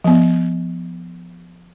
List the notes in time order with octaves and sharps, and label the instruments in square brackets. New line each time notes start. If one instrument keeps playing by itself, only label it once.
[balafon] F3 B3